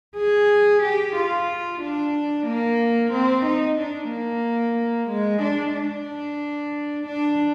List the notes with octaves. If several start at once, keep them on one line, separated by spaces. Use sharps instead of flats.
G#4
G4
F4
D4
A#3
C4
D#4
D4
A#3
G#3
D4
D4
D4